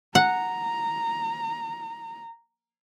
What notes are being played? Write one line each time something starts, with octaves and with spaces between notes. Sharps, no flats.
F#5 A#5